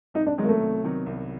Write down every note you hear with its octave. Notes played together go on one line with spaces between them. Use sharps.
C2 D#4
D4
C3 D#3 F#3 G#3 B3
A#3
A3
C2
C3 D#3 F#3 B3
C2